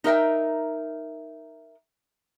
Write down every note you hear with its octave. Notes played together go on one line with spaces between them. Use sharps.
D#4 A#4 E5 G5